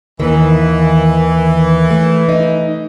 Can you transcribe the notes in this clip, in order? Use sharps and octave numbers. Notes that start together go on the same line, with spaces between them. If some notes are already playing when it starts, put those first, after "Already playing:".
D#2 D#3 E3
A3
D#4